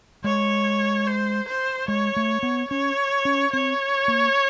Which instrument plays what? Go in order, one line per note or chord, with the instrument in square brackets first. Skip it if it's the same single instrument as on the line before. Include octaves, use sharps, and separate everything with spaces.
[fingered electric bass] G#3 [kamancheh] C#5
[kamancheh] C5
C5
[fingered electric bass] G#3 [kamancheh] C#5
[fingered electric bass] A3
B3
[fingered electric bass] C#4 [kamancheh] C#5
[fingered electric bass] C#4
[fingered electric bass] C4 [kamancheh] C#5
[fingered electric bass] A#3